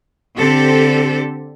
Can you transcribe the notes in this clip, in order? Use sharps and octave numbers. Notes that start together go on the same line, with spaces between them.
D3 C4 G4 A4